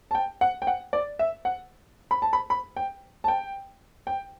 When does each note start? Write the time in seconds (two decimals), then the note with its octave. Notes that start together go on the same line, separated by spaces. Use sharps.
0.11 A5
0.15 G5
0.41 F#5
0.62 G5
0.67 F#5
0.93 D5
1.19 E5
1.45 F#5
2.11 B5
2.22 A5
2.33 B5
2.50 B5
2.77 G5
3.24 A5
3.28 G5
4.07 G5